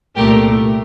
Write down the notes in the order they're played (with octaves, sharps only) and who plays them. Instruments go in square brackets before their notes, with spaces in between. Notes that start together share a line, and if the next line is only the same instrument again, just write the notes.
[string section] C2 A#2 A3 G4 A#4